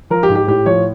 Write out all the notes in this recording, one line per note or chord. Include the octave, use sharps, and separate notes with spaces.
F3 A#4
G4
G#2
G4
A2 G4
F3 C#5